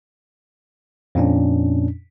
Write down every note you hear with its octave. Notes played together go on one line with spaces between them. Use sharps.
F2 A#2 C#4 D4